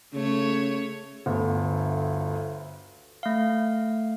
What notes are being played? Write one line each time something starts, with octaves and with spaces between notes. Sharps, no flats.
C#3 A3 C#5
G1 D2
A3 F5